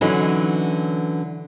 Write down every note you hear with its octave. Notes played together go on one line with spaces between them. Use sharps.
D3 E3 F#3 C#4 D#4